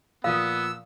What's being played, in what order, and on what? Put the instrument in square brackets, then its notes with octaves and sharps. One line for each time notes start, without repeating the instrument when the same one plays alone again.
[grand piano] A#2 F3 D#6 [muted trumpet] B3 [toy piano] F5 [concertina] E6